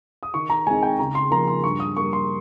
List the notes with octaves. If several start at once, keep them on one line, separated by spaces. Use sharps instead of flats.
D#6
D#3 C#6
A#5
G#3 C4 D#4 G#5
G5
C#3 A#5
C6
F3 A#3 D#4 A#5
C6
G2 C#6
D#6
G3 A#3 C#6
C6